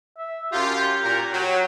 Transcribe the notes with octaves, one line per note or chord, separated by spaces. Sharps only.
E5
F#2 F4 G4
A#2 A#4
F#3 G5